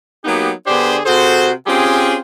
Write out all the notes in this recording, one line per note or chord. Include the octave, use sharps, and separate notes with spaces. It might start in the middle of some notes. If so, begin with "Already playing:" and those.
F#3 A#3 B3 D#4 G4
D3 B3 D4 G4 G#4 C5
C3 F#4 G#4 A4 C5
C4 C#4 F4 G4 G#4